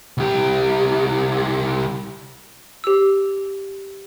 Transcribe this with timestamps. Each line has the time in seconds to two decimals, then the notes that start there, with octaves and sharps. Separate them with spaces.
0.18 C2 G4
2.84 G4 E6